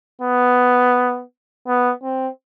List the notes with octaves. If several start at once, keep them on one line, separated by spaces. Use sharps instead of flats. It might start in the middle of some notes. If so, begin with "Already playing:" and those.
B3
B3
C4